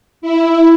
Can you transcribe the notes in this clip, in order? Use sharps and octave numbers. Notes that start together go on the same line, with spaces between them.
E4